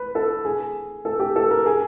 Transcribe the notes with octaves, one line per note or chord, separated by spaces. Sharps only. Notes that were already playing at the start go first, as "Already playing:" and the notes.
Already playing: B4
A4
G#4
A4
G4
A4
A#4
G#4